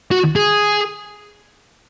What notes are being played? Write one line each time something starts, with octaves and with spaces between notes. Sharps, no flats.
F#4
G#4